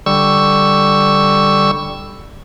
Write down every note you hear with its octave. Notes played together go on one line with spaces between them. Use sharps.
D3 G3 C#6 E6